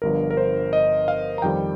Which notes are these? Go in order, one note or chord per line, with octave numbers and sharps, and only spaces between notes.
G1 G2 F3 A#4
A#4
C5
D#5
F5
A#5
F2 D#3 G3 G5